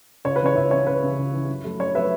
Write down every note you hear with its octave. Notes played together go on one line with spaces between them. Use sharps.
C#2 C#5
B4
C#3 E3 C#5
C#2 B4 E5
C#3 E3 C#5
C#2 B4
C#3 E3
C#2
C#3 E3
F#2
F#3 A3
F#2 C#5
F#3 A3 B4 E5